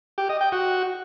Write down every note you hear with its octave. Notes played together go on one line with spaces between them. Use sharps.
G4
D#5
G5
F#4